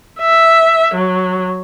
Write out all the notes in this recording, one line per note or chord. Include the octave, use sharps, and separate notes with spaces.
E5
F#3